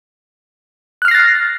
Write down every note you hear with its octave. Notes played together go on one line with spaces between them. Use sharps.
F6 F#6 A6 A#6 C7